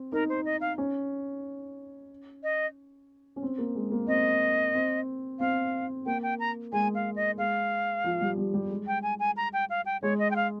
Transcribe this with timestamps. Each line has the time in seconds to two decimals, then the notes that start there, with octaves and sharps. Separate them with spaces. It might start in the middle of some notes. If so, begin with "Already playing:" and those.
Already playing: C4
0.12 D#4 A#4
0.29 C5
0.45 D#5
0.61 F5
0.78 C#4
2.43 D#5
3.36 C#4
3.43 C4
3.58 A#3
3.75 G#3
3.92 A#3
4.08 C4 D#5
4.75 C4
5.40 C4 F5
6.06 A#3 G5
6.23 G5
6.39 A#5
6.73 G#3 G#5
6.95 F5
7.16 D#5
7.38 G#3 F5
8.04 F3
8.21 G3
8.37 G3
8.54 G3
8.70 G#3
8.87 G5
9.03 G#5
9.20 G#5
9.37 A#5
9.53 G5
9.70 F5
9.86 G5
10.02 G#3 C#5
10.19 D#5
10.31 G5
10.36 F5